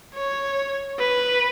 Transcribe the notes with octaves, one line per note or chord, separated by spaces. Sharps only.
C#5
B4